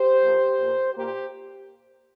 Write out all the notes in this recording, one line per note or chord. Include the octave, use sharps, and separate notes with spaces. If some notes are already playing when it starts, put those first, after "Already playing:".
Already playing: G4 C5
A#2 F3 A#3
A#2 A#3
A#2 A#3 G4 C5